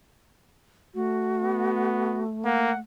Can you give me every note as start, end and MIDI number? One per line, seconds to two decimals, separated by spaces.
0.94 2.79 57
0.94 2.23 66
1.43 2.24 59
2.45 2.72 58
2.45 2.77 78